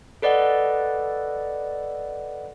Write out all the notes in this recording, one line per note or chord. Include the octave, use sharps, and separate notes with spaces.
A4 B4 D5 D#5 F#5